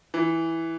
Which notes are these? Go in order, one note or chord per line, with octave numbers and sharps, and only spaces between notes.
E3